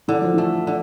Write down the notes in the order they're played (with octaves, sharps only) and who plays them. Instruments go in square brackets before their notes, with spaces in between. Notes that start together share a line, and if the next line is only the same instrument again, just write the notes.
[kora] D3 [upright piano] E3
[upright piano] F3
[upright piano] E3 [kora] A3
[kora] D3